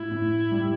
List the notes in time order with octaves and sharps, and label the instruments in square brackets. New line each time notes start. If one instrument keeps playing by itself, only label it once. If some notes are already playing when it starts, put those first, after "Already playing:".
Already playing: [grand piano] A2 [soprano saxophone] E4
[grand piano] A2
G3